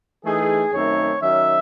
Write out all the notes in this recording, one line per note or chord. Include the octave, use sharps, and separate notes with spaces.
E3 A3 D#4 G#4
F#2 D#3 A3 C4 D#4 C#5
D#3 F#3 C#4 E5